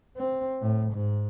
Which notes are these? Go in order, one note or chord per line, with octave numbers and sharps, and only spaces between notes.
C4
A2
G#2